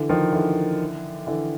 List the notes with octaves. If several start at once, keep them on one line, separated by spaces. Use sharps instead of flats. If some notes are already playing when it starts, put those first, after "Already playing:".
Already playing: D3 E3
D#3 F3
D3 E3
D3 E3